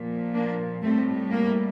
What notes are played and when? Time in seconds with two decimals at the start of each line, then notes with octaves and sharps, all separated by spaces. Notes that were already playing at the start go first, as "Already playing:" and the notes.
Already playing: A#2 F3
0.34 A#3 D4
0.83 A2 G3 A3 C4
1.32 A#3